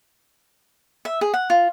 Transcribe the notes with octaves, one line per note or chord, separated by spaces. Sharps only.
E5
G#4
F#5
F4